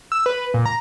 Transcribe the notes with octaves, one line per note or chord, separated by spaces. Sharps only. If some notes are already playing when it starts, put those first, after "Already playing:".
E6
B4
A#2
A#5